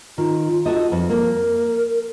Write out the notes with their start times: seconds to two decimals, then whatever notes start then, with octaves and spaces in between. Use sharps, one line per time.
0.18 D#3 F4
0.66 F#4 A4 D#5
0.92 F2
1.10 A#3 A#4